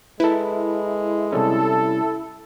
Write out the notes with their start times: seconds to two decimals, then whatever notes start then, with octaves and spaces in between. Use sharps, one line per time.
0.20 G#3 E4 A4 B4
1.32 C3 G3 C#4 A4